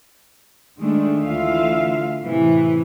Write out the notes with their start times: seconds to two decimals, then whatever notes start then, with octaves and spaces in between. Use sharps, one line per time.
0.80 D#3 G#3 A3 D4
1.22 D2 D3 E3 F4 E5 F5
2.21 A2 C3 E3